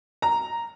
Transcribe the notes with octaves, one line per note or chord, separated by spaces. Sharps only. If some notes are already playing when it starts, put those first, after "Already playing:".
A#5